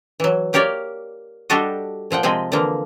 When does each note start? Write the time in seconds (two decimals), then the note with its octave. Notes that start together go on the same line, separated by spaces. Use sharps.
0.20 E3 F#3
0.53 A#3 G4 A#4 C#5 D5
1.50 G3 D4 F#4 G4 A4 D#5
2.11 A#2 F3 F#5 G5
2.23 C3 F3 G#3 C4 D#5
2.52 D3 E3 F3 A#3